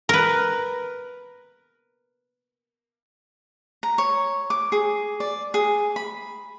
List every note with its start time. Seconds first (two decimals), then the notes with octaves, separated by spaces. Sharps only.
0.09 A#4 B4
3.83 A#5
3.98 C#5
4.50 D6
4.72 G#4
5.20 D5
5.54 G#4
5.96 B5